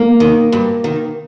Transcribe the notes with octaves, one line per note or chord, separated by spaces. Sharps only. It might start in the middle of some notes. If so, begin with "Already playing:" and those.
Already playing: A#3
D#3
G2
D#3